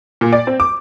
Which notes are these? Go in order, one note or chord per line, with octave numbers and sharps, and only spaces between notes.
A#2
D5
C4
D6